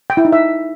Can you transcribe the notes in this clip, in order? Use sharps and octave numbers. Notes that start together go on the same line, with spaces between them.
G5
E4
D#4
E5